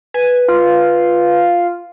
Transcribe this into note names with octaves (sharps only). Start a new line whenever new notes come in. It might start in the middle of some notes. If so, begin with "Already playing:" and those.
B4 G#5
F4